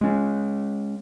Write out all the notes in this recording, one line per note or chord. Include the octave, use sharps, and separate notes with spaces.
G#3 C#4